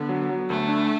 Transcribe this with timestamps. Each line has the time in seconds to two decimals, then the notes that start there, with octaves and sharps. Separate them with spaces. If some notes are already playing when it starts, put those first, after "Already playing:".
Already playing: D3 B3
0.09 F#3
0.29 F#3
0.49 D2 A3
0.69 D4